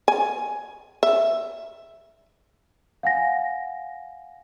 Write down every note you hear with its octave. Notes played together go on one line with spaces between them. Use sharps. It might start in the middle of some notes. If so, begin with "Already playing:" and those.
G#5
E5
F5 F#5 G#5 A#6